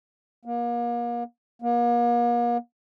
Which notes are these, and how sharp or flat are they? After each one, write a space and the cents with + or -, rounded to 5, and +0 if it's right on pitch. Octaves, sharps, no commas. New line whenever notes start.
A#3 +35
A#3 +40